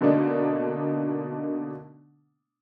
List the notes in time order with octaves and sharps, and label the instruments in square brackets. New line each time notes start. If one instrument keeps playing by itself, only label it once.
[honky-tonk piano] B2 D3 A3 A#3 D4 D#4